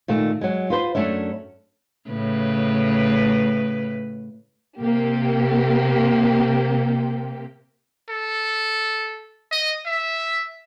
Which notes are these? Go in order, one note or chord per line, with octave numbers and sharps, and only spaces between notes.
A#2 D#3 A3
F#3 G#3
F4 B4 C5
F#2 A3 C#4 D4 E5
A2 C#3 B4
C3 A#3 G4
A4
D#5
E5